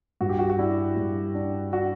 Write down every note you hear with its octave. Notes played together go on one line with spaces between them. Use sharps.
G2 F#4
G4
F#4
F#4
D4 E4
G2
D4
D4 F#4